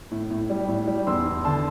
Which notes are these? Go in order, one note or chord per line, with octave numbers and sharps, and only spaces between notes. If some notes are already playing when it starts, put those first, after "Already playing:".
A2
A2
G3
A2
G3
E2 C6 E6
E2
D3 A5 C6